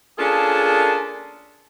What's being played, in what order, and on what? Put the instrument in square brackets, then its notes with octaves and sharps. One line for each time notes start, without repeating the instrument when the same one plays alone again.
[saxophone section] A#3 C#4 D4 F4 G#4 A4